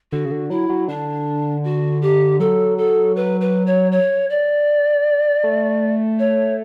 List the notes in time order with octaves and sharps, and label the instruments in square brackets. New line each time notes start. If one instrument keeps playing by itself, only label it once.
[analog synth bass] D3 [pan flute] F#4
[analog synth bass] C#3
D3
[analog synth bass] F#3 [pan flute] E4
[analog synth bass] F#3
[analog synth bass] D3 [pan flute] D4
[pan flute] F#4
G4
[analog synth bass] F#3 [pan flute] A4
[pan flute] A4
B4
B4
C#5
C#5
D5
[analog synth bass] A3
[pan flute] C#5